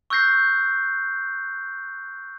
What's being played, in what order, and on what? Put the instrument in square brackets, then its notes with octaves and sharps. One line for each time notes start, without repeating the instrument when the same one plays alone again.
[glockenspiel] C#6 E6 F#6 G6 A#6 C7